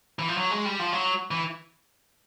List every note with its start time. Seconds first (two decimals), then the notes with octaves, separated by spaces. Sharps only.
0.19 E3
0.28 F3
0.38 F#3
0.51 G#3
0.65 G3
0.79 F3
0.93 F#3
1.31 E3